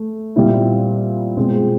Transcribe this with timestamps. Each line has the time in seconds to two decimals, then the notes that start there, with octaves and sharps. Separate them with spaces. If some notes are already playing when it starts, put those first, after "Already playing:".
Already playing: A3
0.36 A#2 G3 C4 E4
1.37 B2 G#3 C4 F4